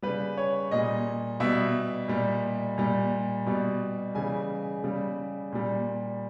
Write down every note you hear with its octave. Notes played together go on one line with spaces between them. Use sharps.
C#3 G3 B4
C#5
A#2 G3 D#5
B2 G3 E5
A#2 G3
A#2 G3
B2 G3
C#3 E3 G3 G#5
C#3 G3
A#2 G3